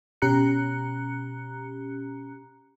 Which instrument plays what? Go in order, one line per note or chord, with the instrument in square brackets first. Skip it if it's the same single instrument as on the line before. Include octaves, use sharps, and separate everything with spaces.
[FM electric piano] B2 C#4 G4 A#5 F#6 C#7